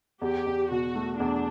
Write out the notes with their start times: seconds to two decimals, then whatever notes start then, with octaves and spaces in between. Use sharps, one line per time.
0.21 E2 G4
0.47 E2
0.70 B2 F#4
0.95 A3
1.19 E2 D4